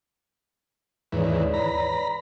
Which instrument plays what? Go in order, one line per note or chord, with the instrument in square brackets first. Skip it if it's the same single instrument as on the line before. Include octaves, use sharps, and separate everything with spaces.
[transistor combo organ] D#2 G#2 E3 [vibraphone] B4 C#5 D5
[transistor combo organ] A#5 B5